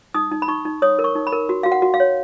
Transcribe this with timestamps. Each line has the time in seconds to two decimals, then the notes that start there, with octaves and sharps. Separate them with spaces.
0.14 D#4 D#6
0.31 D#4
0.42 B5
0.48 D#4 C#6
0.65 D#4
0.82 C#5 D#6
0.99 A#4
1.04 C#6
1.15 D#4
1.27 B5
1.32 A#4
1.49 F#4
1.63 F#4 F5
1.72 F#5
1.82 F#4
1.94 F5
2.00 C#5